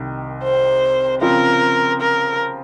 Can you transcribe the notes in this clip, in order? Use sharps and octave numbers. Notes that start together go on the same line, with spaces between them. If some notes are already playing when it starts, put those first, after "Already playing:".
Already playing: C2 C3 D#3
C5
C#3 F3 C4 F4 A#4
A#4